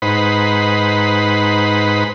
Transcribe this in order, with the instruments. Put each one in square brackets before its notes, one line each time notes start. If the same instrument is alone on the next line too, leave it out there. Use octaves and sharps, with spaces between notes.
[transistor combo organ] G#2 D#4 B4 C5 F#5 B5